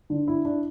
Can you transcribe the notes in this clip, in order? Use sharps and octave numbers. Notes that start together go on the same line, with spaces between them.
D3
E4
D4